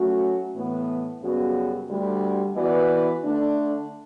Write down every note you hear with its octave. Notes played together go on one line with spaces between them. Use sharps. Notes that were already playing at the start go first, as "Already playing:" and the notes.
Already playing: F#3 A3 C#4 F#4
A2 E3 B3
F#2 C#3 G3 B3 F#4
D2 D3 G3
E3 B3 F#4 B4 D5
D3 A3 D4